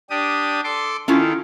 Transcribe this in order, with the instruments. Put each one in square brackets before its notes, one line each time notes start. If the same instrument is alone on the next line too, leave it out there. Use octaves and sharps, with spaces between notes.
[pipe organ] D4 G4 D#6
A4 C6 D6
[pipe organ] D#3 A4 [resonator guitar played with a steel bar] C#4 E4 F4